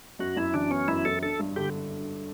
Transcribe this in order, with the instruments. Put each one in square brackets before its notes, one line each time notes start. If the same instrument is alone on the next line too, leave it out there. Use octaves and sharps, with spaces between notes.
[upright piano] F#2 [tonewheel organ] F#4
[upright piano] F#2 [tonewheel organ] E4
[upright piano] E3 [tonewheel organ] D4
[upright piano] B3 [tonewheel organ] C#4
[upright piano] F#2 [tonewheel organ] E4
[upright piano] F#2 [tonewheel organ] A4
[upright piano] D4 [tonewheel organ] A4
[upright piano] G2
[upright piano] D3 [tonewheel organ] G4